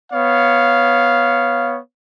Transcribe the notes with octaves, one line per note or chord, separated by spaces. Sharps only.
B3 C#5 F5